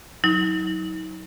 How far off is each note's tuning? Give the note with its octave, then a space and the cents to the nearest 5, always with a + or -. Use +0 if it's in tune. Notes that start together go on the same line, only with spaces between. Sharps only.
F#3 +0 D#4 +40